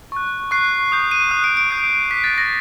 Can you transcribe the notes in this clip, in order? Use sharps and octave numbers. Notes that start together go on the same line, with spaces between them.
C#6 F#6
C#6 F#6 C7
D#6 G6
D#7
D#6 F#6
D7
D7
D#6 G6 C7
D6 F#6 B6
A6
A#6